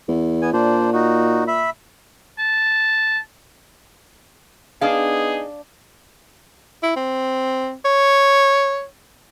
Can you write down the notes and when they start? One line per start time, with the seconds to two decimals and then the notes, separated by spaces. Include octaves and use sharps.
0.08 E2
0.42 B3 G#5
0.53 A#2 D4 C5
0.93 D#4 F#4
1.48 E5 B5
2.39 A5
4.81 B3 D4 D#4 G#4 F5
6.83 E4
6.96 C4
7.85 C#5